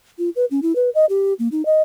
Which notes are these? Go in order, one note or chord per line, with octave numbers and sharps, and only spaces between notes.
F4
B4
C#4
E4
B4
D#5
G4
A#3
D#4
D#5